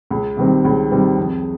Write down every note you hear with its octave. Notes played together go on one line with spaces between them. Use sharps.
C#2
C3 D#3 G3 C4
C#2
C3 D#3 G3 C4
F2